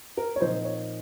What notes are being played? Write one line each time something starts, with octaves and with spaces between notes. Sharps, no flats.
A#4
C#5
A#2 F3 C4 D#4 C5
C#5